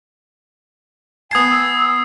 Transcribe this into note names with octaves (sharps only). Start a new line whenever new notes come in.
B3 G#5 A5 D#6 G#6 C7
E6